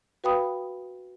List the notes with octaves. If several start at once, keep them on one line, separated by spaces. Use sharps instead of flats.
F#4 B4 F5 G5 B5 D#6